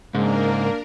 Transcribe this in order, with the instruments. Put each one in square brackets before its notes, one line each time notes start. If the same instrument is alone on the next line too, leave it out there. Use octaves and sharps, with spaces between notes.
[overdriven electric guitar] G#2 [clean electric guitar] C#3 G#3 [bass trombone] A#3 [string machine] D4 A#4